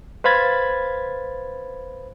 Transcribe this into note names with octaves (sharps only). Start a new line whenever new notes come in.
B4 C5 F5 B5 G#6 A6